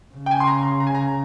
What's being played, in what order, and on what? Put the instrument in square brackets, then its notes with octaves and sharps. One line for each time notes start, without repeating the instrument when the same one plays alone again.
[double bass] C#3
[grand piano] G5
G#5
C6
A#5
C6
A#5
G#5
A#5